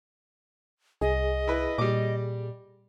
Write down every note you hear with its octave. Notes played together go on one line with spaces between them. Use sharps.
C2 G#4 D#5
E4 B4
A#2 G3 D6